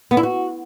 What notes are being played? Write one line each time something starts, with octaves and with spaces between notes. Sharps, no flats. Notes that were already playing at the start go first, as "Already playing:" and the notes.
B3
E4
F#4